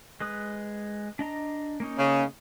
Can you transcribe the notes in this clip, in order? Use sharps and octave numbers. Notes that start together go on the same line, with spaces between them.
G#3 B4 D#6
D4 D#5 A#5
A#3 C#4 D#4
C#3